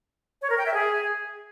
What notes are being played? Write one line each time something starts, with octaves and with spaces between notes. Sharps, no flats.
C#5
A#4
G5
E5
G#4